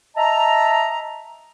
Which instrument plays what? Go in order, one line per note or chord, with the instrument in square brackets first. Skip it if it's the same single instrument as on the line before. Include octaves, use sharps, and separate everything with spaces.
[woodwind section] D#5 E5 A5 A#5